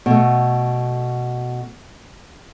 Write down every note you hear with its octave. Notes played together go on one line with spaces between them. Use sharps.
B2 A3